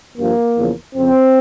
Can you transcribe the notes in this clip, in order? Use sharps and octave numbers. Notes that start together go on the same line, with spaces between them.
G2 F3 A#3
E2 C#3 F3
F2 C#3 F3 C4